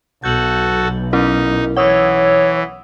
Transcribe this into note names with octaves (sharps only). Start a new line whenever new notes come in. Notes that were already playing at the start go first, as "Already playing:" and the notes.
B1 F#4 A4 G6 F#7
C#4 D#4 E4 A#4
E3 C#5 F#5 D#6 E6